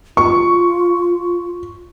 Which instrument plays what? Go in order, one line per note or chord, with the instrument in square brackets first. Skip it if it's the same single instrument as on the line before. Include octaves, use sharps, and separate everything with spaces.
[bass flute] F4 [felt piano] C#6